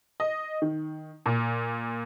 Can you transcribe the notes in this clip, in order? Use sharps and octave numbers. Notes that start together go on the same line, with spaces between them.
D#5
D#3
A#2